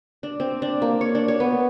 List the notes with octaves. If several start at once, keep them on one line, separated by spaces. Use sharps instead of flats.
D4
C4
D4
A#3
C#5
D4
C#5
B3